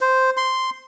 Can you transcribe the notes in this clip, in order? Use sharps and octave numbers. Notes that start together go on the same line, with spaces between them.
C5
C6